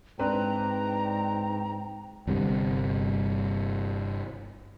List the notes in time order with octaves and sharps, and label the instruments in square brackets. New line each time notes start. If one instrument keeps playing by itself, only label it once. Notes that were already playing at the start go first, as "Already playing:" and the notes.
[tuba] G#2 [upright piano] C4 D4 B4 [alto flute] G5 [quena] A#5
[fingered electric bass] G1 G2 C3